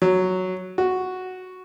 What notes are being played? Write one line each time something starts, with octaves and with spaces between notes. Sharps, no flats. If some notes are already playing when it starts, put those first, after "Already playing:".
F#3
F#4